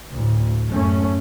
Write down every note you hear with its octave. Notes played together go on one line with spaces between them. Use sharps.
D2 A2
F#2 A3 C#4